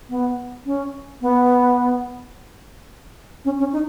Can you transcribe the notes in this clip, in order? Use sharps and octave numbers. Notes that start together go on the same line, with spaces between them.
B3
C#4
B3
C#4
C#4
D#4